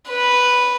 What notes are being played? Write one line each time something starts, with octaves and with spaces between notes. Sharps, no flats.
B4